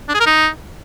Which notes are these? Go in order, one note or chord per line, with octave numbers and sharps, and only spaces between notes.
D4
G#4
A#4
D#4